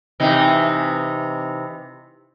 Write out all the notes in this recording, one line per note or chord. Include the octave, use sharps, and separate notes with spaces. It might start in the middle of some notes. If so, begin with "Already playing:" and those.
C3 E3 D#4